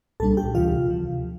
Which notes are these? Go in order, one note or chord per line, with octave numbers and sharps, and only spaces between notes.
C2 A#2 G3 D4 A4 A5
G4 G5
D2 C3 E3 F4 F5
D2 C3 F3